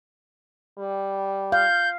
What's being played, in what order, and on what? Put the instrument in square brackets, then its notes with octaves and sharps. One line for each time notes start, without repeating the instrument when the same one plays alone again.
[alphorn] G3
[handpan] F5 [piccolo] G6